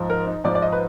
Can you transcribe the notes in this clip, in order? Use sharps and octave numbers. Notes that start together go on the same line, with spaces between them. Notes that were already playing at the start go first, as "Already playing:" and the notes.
Already playing: G#2 F3
A#4
D#4
G#2 F3 D5
D5
D#5
B4